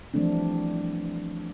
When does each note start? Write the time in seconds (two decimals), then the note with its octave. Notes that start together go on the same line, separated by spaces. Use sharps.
0.14 E3 F3 G3 A3 C4 D4